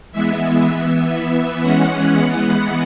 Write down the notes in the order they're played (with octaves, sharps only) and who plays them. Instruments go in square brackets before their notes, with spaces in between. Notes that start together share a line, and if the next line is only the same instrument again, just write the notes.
[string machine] E3 G#3 B3 E5
E3 B3
E3 B3 E5
E3 G#3 C#4 F#5
E3 G#3 B3